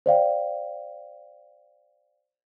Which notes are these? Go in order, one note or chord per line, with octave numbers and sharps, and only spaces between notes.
C5 D5 F5 G5